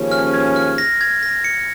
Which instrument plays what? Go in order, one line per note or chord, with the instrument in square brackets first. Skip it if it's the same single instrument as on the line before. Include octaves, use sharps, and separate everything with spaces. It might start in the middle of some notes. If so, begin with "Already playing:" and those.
Already playing: [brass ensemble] D#2 C#3 F3 C#4
[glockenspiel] F6
G#6
F6
A#6
G#6
A#6
C#7